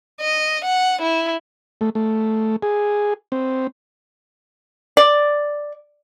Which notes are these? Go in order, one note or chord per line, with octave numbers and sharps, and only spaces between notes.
D#5
F#5
E4
A3
A3
G#4
C4
D5